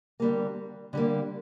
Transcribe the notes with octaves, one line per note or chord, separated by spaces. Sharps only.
D3 G3 A#3
D3 G3 A#3